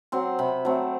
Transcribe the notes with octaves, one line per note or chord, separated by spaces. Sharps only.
F#3 C4 C6
C3 B5
F#3 A3 C4